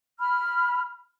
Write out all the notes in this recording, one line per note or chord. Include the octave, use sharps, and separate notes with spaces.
B5 F6